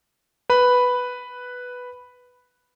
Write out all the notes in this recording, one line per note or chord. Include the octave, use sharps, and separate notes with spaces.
B4 B5